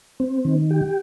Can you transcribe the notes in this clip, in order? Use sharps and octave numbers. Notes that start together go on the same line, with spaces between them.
C4
D#3
G4